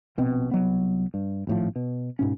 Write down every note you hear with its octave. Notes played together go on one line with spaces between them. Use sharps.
A#1 B2 C4
C2 F#3 B3
G2
G#1 A2 F3
B2
G#2 B2 C#4